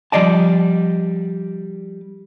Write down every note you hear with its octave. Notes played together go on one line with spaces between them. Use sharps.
F3 G3 D5 D#5 A5